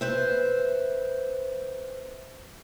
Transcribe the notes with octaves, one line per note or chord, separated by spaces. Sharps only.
B4 C5 E5